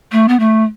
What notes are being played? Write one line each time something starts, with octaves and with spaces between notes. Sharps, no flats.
A3
B3
A3